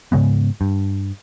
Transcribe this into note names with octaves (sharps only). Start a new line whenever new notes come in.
G#2 C#3 G#3 B3
G2